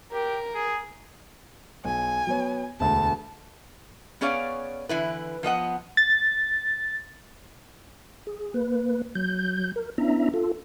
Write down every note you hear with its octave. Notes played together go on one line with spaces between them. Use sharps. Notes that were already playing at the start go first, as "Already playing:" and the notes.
G4 A#4
G#4
B1 G#5
F#3 B3 C#5
E1 D2 A5
B3 C#4 G#4 C#5 D5 F5
D3 E3 E4 B4
F3 B3 D#5 F#5
A6
G#4
A#3 B4
F#3 G6
A#4
B3 C#4 D4 E4 E5 A#5
F4 A4